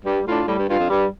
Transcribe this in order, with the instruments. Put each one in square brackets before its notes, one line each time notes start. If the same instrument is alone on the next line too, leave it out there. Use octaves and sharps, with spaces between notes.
[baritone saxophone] G2 [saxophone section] G3
[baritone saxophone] A2 [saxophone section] D4 F4
[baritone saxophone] A2 [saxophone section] G3
[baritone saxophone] G2
[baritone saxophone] G2 [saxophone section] D4 F4
[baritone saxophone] F2
[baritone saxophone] G2 [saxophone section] G3